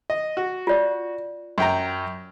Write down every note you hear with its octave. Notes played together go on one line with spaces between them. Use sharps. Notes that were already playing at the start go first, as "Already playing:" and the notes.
D#5
F#4
F4 D5
F#2 G5 A#5